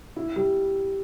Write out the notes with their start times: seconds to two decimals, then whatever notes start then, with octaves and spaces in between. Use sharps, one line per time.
0.16 E4
0.36 G3